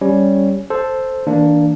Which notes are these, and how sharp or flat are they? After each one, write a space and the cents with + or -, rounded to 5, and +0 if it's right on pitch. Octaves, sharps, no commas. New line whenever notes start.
G3 +0 C#4 +0 C#5 +0
A4 +0 C5 +0
E3 -45 A#3 +0 D4 +0